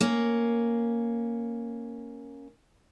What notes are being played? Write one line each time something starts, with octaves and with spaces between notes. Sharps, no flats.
A#3 C#4